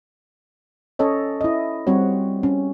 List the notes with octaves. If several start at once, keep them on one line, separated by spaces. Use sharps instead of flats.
C#4 A4 C#5 D#5
E4 D#5
G3 C4 F#4 C#5
C#4